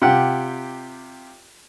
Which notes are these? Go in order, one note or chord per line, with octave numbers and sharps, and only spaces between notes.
C3 F4 G4 F#5 G5